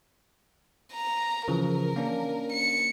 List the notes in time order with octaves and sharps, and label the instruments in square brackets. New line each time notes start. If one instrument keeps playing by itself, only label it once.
[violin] A#5
[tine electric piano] C#3 E3 F3 [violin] A#4
[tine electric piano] A#3 C#4 D4
[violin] C#7